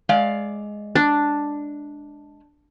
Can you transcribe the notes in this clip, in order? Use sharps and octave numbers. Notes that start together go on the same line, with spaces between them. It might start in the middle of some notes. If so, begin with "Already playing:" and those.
G#3 D5 F5
D4